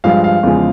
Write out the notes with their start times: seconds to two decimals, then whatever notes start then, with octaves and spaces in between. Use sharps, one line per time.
0.04 G2 F3 G#3 F5
0.24 F5
0.43 E2 C#3 F3 G#3